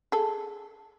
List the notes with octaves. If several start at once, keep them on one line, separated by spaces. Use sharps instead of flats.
G#4 A4